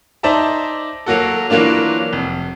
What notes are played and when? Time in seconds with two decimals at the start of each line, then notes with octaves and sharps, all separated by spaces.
0.23 D#4 C5 D5 E5 A5 A#5
1.06 F#3 A#3 F#4 A4
1.50 E3 F#3 A#3 D4 F4
2.13 F1